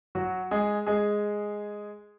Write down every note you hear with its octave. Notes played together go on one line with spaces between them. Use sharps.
F#3 F#4
G#3 G#4
G#3 G#4